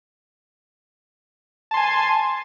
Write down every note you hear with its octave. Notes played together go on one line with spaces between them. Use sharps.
G#5 A5 C6